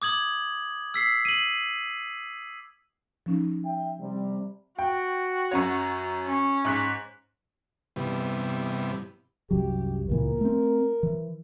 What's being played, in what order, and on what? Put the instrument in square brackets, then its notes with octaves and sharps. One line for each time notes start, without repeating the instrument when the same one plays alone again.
[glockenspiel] D6 D#6 G#6 F#7
E6 B6 C7
D#7 F#7
[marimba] F3 C#4 D#4
[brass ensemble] E5 G5
C3 G3
[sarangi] F#4 [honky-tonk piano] G5
[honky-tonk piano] F#2 C#4 C#5
[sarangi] C#4
[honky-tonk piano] G#2 F#6 B6
[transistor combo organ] G2 C3 E3 G3 B3
[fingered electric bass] C2 F#2 F#3 [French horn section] G4
[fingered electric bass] C#2 A#2 E3 [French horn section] A#4
[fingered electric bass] A3 C4
E3